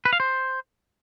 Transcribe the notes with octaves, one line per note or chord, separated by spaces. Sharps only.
B4
F5
C5